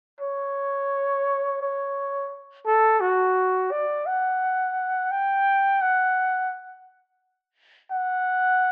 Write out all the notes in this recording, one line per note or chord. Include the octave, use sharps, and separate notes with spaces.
C#5
C#5
A4
F#4
D5
F#5
G5
F#5
F#5